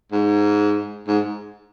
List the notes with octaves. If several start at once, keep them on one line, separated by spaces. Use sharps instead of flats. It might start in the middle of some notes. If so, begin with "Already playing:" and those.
G#2
G#2